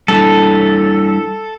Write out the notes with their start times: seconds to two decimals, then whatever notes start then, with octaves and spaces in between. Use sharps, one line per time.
0.08 G3 D4 E4 A4